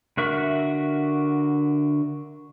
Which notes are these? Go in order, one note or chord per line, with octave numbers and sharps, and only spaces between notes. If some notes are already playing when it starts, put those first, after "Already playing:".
D3 F#4 A#4 E5 C#6